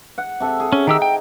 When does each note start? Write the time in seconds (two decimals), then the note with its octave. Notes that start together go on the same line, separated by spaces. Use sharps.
0.18 F#5
0.40 C3 A4 E5
0.60 G#4
0.73 C#4
0.87 D#3 D#4 G4 E6
1.02 G5